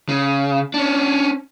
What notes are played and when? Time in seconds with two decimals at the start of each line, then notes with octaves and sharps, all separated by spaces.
0.09 C#3
0.74 C#4 D4